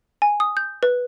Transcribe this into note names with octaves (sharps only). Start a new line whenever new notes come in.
G#5
D#6
G6
B4